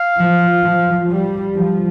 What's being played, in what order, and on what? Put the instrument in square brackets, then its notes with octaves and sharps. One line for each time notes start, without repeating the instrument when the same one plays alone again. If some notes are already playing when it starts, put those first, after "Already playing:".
Already playing: [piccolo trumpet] F5
[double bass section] F3
F3
G3
F3